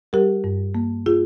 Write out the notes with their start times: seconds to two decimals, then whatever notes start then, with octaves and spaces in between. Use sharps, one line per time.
0.13 G3 G4 A#4
0.44 G2
0.75 A#3
1.06 F4 G#4